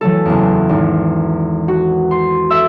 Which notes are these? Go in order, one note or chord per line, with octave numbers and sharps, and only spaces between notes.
E3 F#3 A3 A4
F#1 E2
G#1
F#4
C6
A4 E5 E6